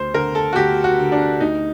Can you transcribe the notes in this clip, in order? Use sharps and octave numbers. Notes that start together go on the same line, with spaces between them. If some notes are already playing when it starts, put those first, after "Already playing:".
Already playing: D2 C5
D3 A#4
A4
F#4
D2 G4
F#4
D3
D4
D2 D#4